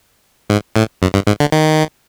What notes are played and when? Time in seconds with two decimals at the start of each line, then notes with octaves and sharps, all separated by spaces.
0.50 G#2
0.76 A2
1.02 F#2
1.14 G2
1.27 G#2
1.40 D3
1.52 D#3